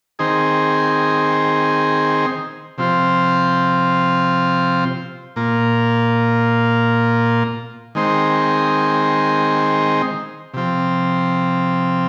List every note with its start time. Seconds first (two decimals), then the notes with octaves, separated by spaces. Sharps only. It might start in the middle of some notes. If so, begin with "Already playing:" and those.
0.19 D#3 C4 D#4 G#4 C5
2.78 C3 F3 C4 F4 C5
5.36 A#2 A#3 F4
7.95 D#3 G#3 C4 D#4 C5
10.54 C3 F3 C4